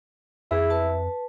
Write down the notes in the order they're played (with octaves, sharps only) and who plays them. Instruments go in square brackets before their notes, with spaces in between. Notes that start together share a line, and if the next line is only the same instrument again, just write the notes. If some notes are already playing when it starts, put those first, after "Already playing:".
[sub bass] F2 [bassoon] E4 [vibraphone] G#4
[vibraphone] B4 A5